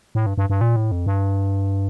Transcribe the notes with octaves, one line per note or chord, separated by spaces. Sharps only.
A2
G2
G2
G2
A#2
A2
F2
G2